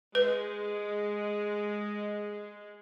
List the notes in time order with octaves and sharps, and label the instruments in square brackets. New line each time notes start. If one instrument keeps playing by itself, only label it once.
[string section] G#3 [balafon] B4